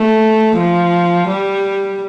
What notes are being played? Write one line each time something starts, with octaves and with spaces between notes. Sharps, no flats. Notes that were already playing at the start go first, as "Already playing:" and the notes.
Already playing: A3
F3
G3